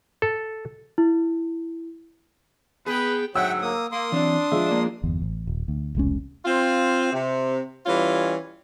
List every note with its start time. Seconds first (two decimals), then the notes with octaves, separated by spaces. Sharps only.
0.22 A4
0.98 E4
2.86 B3 G#4 B4 G5
3.35 D2 G#2 F#3 E5 F#5 G5 E6
3.62 A#3 D#6
3.92 A#3 C6 D#6
4.12 E3 F#3 C4 D4
4.52 F3 G#3 E5
4.71 A#3
5.03 G1 E2
5.22 A1
5.47 D#1
5.68 D2
5.95 E1 C2 G#3 C#4
6.45 C4 F4
7.12 C3
7.86 E3 G3 C#4 F4